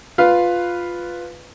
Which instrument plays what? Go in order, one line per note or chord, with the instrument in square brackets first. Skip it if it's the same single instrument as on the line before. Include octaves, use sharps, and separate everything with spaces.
[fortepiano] F4 B4 F5